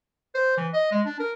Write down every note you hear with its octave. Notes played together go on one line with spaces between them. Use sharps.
C5
E3
D#5
G#3
D4
A#4